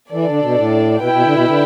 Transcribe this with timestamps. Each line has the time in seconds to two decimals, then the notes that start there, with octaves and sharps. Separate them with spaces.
0.12 E3 D4 A4 D5
0.26 D3
0.42 B2
0.56 A2
1.01 B2 E4 B4 G5
1.12 B2
1.24 D3
1.35 B2
1.47 D3